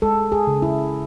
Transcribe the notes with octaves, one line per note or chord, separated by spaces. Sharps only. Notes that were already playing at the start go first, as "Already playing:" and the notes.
G#3 A4
G#4
C#3
E4